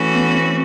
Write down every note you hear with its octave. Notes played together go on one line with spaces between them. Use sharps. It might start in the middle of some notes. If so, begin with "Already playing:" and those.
Already playing: E3 A3 C#4 F#4
B3
C4